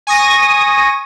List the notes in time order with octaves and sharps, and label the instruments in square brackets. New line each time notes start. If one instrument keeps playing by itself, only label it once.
[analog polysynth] G#5 C#6 D#6 A#6 D#7